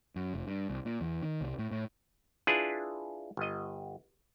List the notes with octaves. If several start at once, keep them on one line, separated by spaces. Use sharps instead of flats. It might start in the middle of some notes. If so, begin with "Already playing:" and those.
F#2
F1
G2
C2
A#2
E2
D#3
C2
A2
A2
D4 E4 F4 G#4 B4
G1 D#5